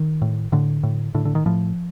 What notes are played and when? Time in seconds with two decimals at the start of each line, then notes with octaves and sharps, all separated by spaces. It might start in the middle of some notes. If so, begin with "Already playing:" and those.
Already playing: D#3
0.22 A2
0.52 A2 D3
0.83 A2
1.14 A2 D3
1.25 D3
1.35 D#3
1.46 A2 F3